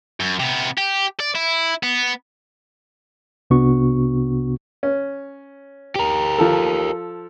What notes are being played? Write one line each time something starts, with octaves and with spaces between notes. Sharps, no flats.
F#2
C3 B3
G4
D5
E4
B3
C2 C3 B3 D4 F#4 C#6
C#4
G4 A#4
F3 A4